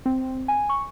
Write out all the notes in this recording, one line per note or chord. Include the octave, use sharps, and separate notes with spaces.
C4
G#5
C#6